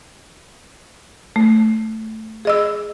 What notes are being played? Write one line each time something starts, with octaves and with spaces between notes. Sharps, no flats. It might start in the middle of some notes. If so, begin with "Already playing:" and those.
A3
G#4 D#5 E6